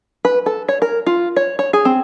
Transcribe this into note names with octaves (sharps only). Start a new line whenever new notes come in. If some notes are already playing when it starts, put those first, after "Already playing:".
B4
A4
C#5
A#4
F4
C#5
C#5
G#4
C4